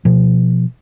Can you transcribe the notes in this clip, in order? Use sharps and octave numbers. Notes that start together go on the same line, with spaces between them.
B2 F3